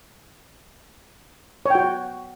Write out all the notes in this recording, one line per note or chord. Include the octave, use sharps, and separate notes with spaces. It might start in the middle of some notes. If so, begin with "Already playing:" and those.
F#4 C#5 G5